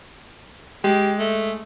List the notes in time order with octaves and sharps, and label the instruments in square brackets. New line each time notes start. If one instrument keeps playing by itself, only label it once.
[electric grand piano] G#3 [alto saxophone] G4
[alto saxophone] A3